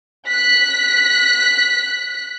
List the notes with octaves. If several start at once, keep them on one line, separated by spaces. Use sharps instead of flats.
F#6 B6